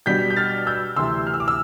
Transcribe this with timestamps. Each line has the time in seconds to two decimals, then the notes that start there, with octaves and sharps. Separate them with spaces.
0.06 B2 G3 D4 G6 B6
0.30 G6
0.36 F6 A6
0.67 E6 G6
0.96 D2 C3 E3 C6 E6
1.27 F6
1.34 E6
1.40 D6
1.48 E6